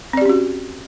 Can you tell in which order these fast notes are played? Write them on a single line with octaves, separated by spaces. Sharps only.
C4 D5 G4 C#4 F#4